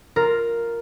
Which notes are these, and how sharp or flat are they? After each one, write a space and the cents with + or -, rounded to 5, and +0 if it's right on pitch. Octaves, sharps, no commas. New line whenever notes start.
F4 +0 A#4 +0